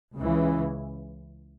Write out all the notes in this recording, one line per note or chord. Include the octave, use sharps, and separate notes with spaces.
C#2 C#3 E3